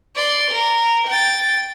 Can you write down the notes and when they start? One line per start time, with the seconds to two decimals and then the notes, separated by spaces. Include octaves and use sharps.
0.15 D5 C6
0.52 A#4
1.08 G5 A6